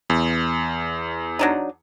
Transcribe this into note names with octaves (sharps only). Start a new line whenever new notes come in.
E2
F#3 D4 D#4